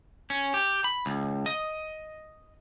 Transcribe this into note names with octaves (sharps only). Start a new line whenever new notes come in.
C#4
G4
B5
C#2
D#5